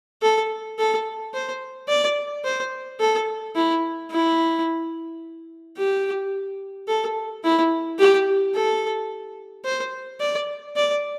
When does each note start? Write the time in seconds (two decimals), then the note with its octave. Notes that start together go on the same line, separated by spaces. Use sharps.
0.22 A4
0.79 A4
1.34 C5
1.89 D5
2.45 C5
3.00 A4
3.56 E4
4.11 E4
5.77 G4
6.88 A4
7.44 E4
7.99 G4
8.55 A4
9.65 C5
10.20 D5
10.76 D5